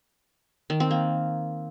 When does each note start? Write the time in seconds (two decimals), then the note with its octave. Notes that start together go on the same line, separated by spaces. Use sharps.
0.70 D#3
0.80 C4
0.91 A#3